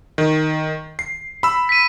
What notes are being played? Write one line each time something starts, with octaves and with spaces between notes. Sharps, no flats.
D#3
C7
B5 E6
B6 D#7